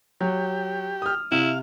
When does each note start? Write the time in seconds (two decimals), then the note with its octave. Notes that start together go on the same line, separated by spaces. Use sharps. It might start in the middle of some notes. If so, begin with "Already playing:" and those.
0.21 F#3 G4
1.02 D#6 F6
1.32 C3 E4 F5